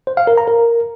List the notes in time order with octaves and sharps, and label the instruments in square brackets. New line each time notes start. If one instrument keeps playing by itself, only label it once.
[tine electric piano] C5
F5
A#4
A#5
A#4